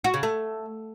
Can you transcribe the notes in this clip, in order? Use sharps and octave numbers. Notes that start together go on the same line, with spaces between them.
F#4
C#3
A3